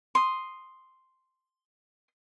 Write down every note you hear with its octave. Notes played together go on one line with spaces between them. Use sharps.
C6 D#6